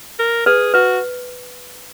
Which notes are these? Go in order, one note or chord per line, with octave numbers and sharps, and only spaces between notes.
A#4
G#4 B4
F#4 B4